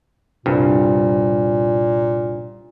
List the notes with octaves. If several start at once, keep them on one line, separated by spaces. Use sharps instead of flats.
C2 G2 A#2